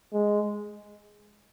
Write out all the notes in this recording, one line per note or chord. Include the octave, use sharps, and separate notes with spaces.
G#3